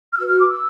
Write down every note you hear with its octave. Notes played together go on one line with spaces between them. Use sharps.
F6
F#4 B4 E6
F6
D6
E6